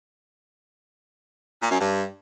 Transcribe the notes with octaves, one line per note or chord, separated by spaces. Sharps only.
A#2
F#2
G2